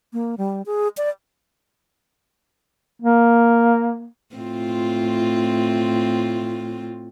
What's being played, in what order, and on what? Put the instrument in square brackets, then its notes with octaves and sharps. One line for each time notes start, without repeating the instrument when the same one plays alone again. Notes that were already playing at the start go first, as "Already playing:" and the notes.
[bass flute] A#3
G3
G#4
D5
[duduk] A#3
[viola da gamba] A2 C4 F4